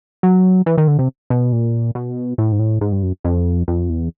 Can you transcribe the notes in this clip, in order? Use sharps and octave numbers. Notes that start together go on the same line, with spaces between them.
F#3
E3
D#3
D3
C3
B2
A#2
B2
A2
G#2
A2
G#2
G2
F#2
F2
F2
E2